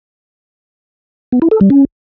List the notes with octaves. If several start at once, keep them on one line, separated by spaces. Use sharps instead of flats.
B3
E4
A4
G3
C#4